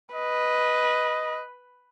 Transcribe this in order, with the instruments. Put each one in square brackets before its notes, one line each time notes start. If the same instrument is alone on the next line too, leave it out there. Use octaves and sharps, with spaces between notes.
[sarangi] B4 [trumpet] D#5